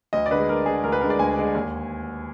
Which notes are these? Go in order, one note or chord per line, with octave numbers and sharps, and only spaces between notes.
D2 D#5
D5
D3 G#3 B4
D2 A#4
G#3 G#4
D3
D2 A#4
B4
D3 G#3 A#4
D5
D2 G#5
D3 G#3
D#2